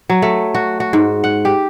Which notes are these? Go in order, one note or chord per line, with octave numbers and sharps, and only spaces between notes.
F#3
A3
F#4
F#4
G#2
F#5
G4